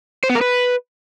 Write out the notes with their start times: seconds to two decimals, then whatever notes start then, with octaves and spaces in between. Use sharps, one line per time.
0.24 C5
0.29 B3
0.35 A#4
0.41 B4